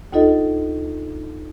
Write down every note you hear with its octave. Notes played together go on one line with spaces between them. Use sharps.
D2 D#4 F4 A4 D#5